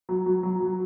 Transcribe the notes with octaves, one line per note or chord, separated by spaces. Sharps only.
F#3
F#3
F#3
F#3